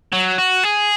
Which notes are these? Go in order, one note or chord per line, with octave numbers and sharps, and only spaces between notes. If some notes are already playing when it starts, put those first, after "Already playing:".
F#3
F#4
G#4